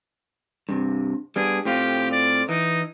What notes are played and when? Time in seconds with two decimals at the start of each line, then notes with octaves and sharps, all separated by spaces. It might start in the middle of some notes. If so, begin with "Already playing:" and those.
0.69 G2 C3
1.36 G3 B3 D4 G#4
1.65 A2 C4 F4 G4
2.11 D5
2.49 E3 D#4